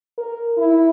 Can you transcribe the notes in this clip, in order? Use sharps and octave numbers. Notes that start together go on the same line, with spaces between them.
A#4
E4